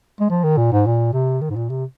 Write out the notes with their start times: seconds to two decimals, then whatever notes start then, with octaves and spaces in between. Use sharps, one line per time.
0.20 G#3
0.30 F3
0.43 D#3
0.57 A#2
0.72 G#2
0.86 A#2
1.13 C3
1.41 D#3
1.50 G#2
1.56 A#2
1.70 C3